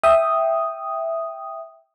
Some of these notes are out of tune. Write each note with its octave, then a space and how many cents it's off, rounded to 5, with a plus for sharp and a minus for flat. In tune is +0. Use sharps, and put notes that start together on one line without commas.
E5 +0 G5 +0 D#6 +0